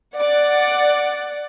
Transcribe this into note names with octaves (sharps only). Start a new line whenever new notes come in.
D5 F#5